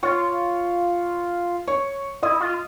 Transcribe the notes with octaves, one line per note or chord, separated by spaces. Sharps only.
F4 C#5 C#6
C#5 C#6
E4 D#5 D#6
F4